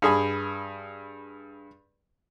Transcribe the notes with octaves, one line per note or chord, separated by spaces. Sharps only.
G2 G#4 B5